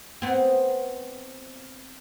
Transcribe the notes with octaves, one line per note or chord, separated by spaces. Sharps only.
B3 C4